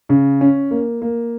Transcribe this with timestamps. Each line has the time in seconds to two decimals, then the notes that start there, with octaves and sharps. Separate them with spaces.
0.09 C#3
0.41 C#4
0.71 A#3
1.02 A#3